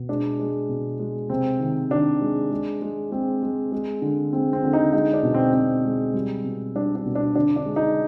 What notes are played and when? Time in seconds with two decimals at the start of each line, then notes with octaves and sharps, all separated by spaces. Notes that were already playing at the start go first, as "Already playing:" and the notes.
Already playing: B2
0.09 G#3 D4
0.39 G#3
0.69 B2
0.99 G#3
1.30 C3 C4
1.60 D#3
1.90 D#3 D4
2.21 G#3
2.51 G#3
2.82 G#3
3.11 G#3 C4
3.43 G#3
3.72 G#3
4.02 D3
4.33 G#3 C4
4.53 C4
4.64 D3
4.73 D#4
4.93 G#3 D#4
5.14 D4
5.23 B2
5.34 C4
5.53 B2 C4
5.85 G#3
6.14 G3
6.44 B2
6.75 G3 D4
6.96 D4
7.06 B2
7.15 D4
7.36 D3 D4
7.57 D4
7.66 G#3
7.76 D#4